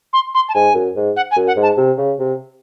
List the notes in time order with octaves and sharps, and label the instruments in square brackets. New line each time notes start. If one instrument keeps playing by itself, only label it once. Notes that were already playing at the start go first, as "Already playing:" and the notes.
[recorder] C6
C6
A5
[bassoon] G#2 [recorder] G#5
[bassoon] F#2
G#2
[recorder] F#5
G#5
[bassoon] F#2
[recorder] F#5
[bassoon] G#2
[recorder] A5
[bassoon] C3
C#3
C3